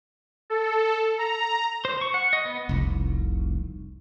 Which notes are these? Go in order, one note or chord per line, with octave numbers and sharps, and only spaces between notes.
A4
A#5
C5
C#6
F#5
D#5
B3
F1 C2